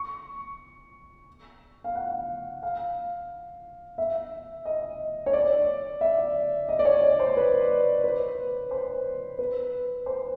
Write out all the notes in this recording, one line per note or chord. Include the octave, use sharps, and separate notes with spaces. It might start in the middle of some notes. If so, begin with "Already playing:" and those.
Already playing: C#6
F5
F#5
F5
E5
D#5
C#5
D5
E5
D#5
D5
C#5
C5
B4
B4
C5
B4
C5